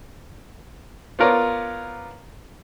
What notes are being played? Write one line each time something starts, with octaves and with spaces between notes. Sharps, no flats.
B3 F4 A#4 C#5 D5